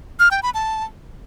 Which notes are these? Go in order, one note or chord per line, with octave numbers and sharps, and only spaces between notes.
F6
G5
B5
A5